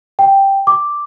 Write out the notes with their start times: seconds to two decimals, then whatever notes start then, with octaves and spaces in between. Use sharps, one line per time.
0.19 G5
0.67 D6